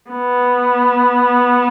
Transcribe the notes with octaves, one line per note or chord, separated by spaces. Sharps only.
B3